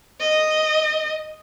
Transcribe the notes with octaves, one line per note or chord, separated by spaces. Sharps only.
D#5